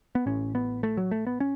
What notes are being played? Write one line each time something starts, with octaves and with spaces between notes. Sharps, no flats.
B3
A1 A2 C#4
B3
A3
F#3
A3
B3
C#4